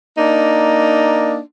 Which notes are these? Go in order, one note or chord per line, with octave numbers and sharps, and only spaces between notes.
A#3 D4 D#4